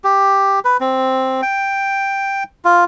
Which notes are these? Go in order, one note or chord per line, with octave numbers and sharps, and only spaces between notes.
G4
B4
C4
G5
F4